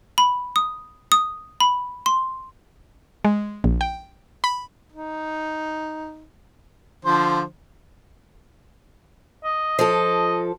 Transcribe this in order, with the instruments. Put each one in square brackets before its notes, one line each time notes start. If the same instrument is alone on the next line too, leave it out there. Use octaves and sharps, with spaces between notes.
[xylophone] B5
D#6
D#6
B5
C6
[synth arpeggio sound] G#3
A#1
G5
B5
[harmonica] D#4
D3 F3 C5
[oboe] D#5
[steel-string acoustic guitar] F3 A4 [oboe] D#5